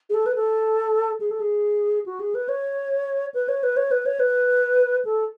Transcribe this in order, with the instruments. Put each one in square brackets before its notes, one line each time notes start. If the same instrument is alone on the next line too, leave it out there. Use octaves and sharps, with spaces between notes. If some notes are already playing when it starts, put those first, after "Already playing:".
[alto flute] G#4
A4
B4
A4
G#4
A4
G#4
F#4
G#4
B4
C#5
B4
C#5
B4
C#5
B4
C#5
B4
A4